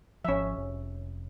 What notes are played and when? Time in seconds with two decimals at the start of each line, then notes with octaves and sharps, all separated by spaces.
0.25 G#1 F3 C#4 E5
0.56 F1